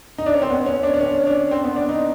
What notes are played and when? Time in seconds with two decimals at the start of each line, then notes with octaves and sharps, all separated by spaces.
0.18 D#4
0.26 D4
0.34 C#4
0.42 C4
0.50 B3
0.66 C#4
0.83 D4
0.94 D4
1.01 C#4
1.27 D4
1.51 C4
1.64 B3
1.76 D4
1.89 D#4